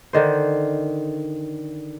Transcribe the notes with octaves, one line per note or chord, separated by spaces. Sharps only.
D3 D#3 C5